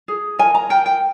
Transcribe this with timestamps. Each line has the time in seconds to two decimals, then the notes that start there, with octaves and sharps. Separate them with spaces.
0.08 G#4
0.38 A#4 G#5
0.54 A#5
0.69 A#4 G5
0.86 G5